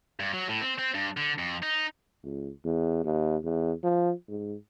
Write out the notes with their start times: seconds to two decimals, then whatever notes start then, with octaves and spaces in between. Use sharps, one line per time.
0.20 G2
0.33 F#3
0.48 A2
0.61 C4
0.78 C4
0.94 G2
1.17 D3
1.39 F2
1.63 D#4
2.24 C#2
2.65 E2
3.04 D#2
3.44 E2
3.83 F3
4.29 G#2